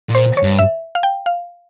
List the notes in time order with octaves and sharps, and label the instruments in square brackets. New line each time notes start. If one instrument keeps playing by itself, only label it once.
[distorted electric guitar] A#2
[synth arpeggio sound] C5
C#5
[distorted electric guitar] G2
[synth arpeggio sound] E5
F5
G5
F5